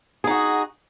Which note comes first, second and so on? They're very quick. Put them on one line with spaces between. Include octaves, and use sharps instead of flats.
G#4 D#4 F#4